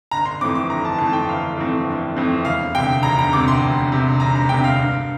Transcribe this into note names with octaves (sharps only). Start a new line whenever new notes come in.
G1 A#5
C6
F2 E3 A3 C4 D6
D6
G1 A#5
A5
F2 E3 A3 C4 A5
G5
G1 F5
F2 E3 A3 C4
G1
F2 E3 A3 C4
E1 F5
D2 C3 G5
E1 A#5
A#5
D2 C3 D6
C6
E1
D2 C3
E1 A#5
A#5
D2 C3 G5
F5
G2